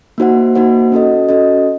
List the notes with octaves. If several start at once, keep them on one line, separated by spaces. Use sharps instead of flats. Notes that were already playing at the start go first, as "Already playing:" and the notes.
A#3 D#4 F#4 C5 F#5
A#3 D#4 F#4 C5 F#5
C#4 F#4 A4 D#5
C#4 F#4 A4 D#5